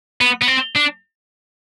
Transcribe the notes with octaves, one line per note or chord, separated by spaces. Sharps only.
B3
B3
C4
D4